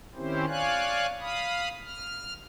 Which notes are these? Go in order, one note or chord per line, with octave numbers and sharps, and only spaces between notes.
D#3 C4 C#4 E4 G4 C5
C#5 D5 F5 G#5 F#6
F5 B5 D#6
F6